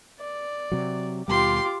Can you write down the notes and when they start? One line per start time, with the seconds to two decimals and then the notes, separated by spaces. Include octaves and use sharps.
0.20 D5
0.72 C3 F#3
1.28 D#2 B2 G3 F4 G4 C6 D6